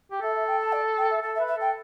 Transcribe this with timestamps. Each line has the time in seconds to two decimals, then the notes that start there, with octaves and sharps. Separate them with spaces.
0.11 G4
0.21 A4 E5
0.34 E5
0.47 G5
0.60 A5
0.72 D5
0.97 G5
1.10 E5
1.22 A4 A5
1.35 E5
1.40 B4
1.47 E5
1.56 A4 G5